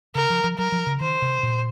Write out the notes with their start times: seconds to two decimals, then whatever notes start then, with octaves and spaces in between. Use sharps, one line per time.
0.15 C#3 A#4
0.30 F3
0.44 F3
0.58 F#3 A#4
0.72 F3
0.87 C#3
1.00 D#3 C5
1.22 C3
1.43 A#2